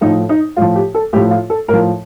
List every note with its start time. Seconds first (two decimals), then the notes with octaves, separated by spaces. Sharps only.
0.01 A2 F3 D#4
0.29 D#4
0.56 A2 F3 F4
0.75 G4
0.94 A4
1.13 A2 G4
1.16 F3
1.31 F4
1.50 A4
1.68 A2 A#4
1.73 F3